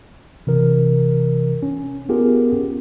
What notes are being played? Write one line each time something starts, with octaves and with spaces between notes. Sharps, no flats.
C3 E3 A#4
C#4
B3 C#4 F4 G4 G#4 A#4